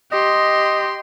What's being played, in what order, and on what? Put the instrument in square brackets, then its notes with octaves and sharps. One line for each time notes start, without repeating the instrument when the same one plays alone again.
[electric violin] G4 C6 [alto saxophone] D#5